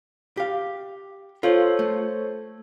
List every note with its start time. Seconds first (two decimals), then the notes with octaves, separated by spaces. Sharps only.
0.37 G4 F5
1.43 F4 A4 C5 C#5
1.79 A3